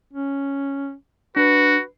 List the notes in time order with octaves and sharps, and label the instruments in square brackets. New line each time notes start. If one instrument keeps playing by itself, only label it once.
[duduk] C#4
[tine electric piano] D4 [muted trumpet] F#4 [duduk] B4